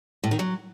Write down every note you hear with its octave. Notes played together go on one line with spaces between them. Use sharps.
A2
D#3
F#3